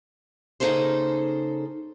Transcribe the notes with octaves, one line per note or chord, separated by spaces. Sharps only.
C#3 A#3 D#4 G#4 A4 C5